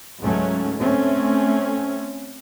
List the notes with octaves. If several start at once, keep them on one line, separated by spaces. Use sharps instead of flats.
C#2 G#2 F#3 A3 C#4
A3 C4 C#4